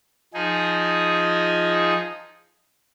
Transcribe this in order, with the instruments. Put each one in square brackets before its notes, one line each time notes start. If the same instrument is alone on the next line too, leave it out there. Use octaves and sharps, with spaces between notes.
[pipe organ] F3 D#4 G#4